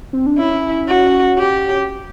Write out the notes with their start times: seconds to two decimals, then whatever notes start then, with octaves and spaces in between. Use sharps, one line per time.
0.13 C4
0.26 D4
0.38 C#4 E4
0.88 F#4
1.38 G4